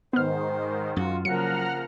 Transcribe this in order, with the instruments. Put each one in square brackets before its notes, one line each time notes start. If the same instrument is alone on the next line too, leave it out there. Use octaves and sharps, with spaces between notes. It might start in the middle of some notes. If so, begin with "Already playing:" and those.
[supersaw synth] G#2 D#3 [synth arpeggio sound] B3 F6 [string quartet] C5
[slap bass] F#2 [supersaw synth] F4 [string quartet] F#4
[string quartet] C#3 F3 A#3 [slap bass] F#3 [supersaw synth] F#5 A#5 F6 [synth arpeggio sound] C#7